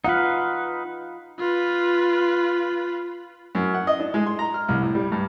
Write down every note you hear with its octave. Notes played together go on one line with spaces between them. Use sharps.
D#4 F4 B4 F5 F#5
F4 B4
F#2
F#5
D#5
D4
G#3
C6
A#5
F6
C2
A2
G3
G2